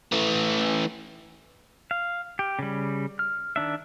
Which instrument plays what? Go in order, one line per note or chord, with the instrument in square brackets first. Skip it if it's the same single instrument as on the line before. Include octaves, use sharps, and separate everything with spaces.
[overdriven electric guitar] E3 A3
[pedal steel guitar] F5
G4
C#3 G3
F6
D#3 D4 E5